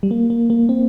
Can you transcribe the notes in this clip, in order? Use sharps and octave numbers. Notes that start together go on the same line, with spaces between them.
G3
A#3
A#3
A#3
C4